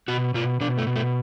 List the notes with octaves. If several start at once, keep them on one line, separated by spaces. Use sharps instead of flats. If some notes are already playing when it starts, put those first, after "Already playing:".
B2 F#4
B2 F4
B2 D4
A3
B2
A3